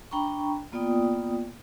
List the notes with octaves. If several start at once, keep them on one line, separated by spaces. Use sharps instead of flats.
D4 G5 A#5 B5 C#6
A#3 B3 F4 D5 G5 D#6